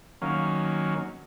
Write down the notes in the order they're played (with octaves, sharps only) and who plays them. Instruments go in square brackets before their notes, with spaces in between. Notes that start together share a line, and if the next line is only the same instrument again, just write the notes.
[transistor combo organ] D#3 F#3 A#3 C#4 F5